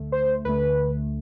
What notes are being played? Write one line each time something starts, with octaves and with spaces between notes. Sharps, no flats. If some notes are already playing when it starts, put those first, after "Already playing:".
Already playing: D2 D3 A3
C5
D2 D3 A3 B4